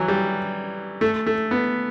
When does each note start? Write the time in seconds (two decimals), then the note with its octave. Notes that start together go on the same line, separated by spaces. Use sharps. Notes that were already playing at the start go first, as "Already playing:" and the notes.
Already playing: E3 F#3
0.08 G3
1.01 A3
1.26 A3
1.51 B3